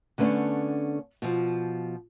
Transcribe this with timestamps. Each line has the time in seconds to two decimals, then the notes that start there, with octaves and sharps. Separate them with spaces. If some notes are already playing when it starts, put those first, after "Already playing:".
0.18 D3 A3 B3 C#4 D4
1.22 B2 F3